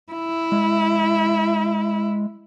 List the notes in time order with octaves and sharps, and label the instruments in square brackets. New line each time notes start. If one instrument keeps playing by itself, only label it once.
[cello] E4
[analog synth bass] G#3